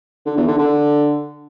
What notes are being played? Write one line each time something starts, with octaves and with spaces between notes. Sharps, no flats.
D3
E2
D3
D3